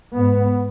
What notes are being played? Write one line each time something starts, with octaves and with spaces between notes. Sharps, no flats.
G#2 B3